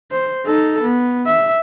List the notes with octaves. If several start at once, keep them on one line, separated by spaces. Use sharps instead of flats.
C5
D#4 A4
B3
E5